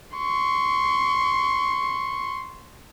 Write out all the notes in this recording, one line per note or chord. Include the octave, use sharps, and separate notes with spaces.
C6 C#6